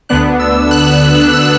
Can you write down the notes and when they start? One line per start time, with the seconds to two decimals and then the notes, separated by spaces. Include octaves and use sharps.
0.09 D2 D3 B3 D4 F#6
0.40 E6
0.71 F#6
1.33 E6